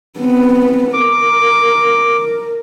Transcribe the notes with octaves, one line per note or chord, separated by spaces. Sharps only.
B3 C4
A#4 D6